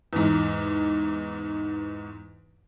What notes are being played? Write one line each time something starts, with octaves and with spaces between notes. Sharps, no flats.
E2 G#2